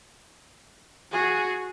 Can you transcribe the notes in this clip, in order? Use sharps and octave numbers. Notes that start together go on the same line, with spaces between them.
F#4 G#4